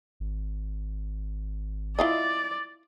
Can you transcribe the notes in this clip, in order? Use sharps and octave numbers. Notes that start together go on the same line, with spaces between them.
G#1
E4 F4 D5 D#5